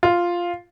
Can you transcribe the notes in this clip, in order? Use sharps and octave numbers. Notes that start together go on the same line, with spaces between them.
F4